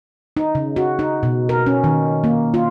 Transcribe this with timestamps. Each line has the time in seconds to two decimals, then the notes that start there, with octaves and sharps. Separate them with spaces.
0.37 D#4
0.55 C#3
0.76 F#4
0.99 D#4
1.23 B2
1.49 A#4
1.66 C#4
1.84 D#3
2.24 A#3
2.54 F4